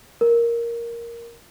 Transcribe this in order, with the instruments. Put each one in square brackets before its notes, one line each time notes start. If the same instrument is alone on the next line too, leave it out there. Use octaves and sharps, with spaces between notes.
[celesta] A#4